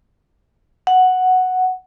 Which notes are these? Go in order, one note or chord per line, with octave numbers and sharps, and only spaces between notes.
F#5